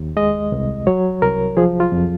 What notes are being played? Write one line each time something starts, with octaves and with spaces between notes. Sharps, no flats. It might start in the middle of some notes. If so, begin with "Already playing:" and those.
Already playing: D#2
G#3 D#5
C2
F#3 C#5
C2 A#4
F3 G#4
F4
F2